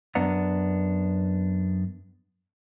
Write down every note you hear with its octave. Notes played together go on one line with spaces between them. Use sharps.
F#2 B3 D4 F#5 A#5